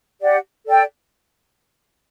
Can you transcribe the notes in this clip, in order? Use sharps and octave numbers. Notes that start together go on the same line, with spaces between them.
G4 D5 F#5
A4 D5 G5